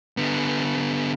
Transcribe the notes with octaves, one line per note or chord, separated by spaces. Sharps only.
D3 B3